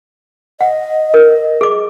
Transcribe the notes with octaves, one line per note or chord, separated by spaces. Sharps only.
D#5 F#5
A#4
G#4 D6